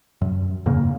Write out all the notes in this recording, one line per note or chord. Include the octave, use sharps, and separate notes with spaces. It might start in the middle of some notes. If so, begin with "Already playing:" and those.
F#2
E2 G#2 C#3 A#3